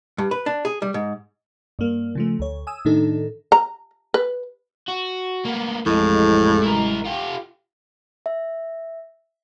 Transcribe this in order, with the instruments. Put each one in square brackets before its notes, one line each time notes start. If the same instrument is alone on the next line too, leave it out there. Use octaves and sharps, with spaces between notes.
[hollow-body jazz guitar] G2
B4
D4
G#4
G3
G#2
[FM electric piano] G2 A#3
C#3 F3 A3
D2 C#5
G#5 D#6 E6
A2 D#3 D4 D#4 A4
[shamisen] A#5
B4
[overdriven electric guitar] F#4
A#3 B3
[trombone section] A1 G#3 [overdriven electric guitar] F2 [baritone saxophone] A2
[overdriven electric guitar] E4 A#4
F4 G4
[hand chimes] E5